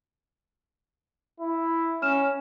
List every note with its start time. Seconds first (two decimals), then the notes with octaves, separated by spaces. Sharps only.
1.40 E4
2.02 C#4 F6 E7